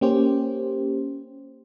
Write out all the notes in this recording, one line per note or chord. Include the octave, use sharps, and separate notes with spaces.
A#3 C#4 G4 C5